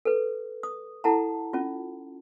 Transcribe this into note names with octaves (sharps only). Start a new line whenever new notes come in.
A4 B4
D#6
E4 A4 F#5 A5 A#5
C#4 F4